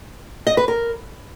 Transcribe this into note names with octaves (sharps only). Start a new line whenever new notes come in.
D#5
B4
A#4